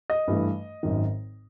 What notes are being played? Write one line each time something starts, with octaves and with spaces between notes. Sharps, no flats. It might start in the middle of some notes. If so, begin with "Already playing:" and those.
D#5
G2 E3 A3
G#1 F#2 D#3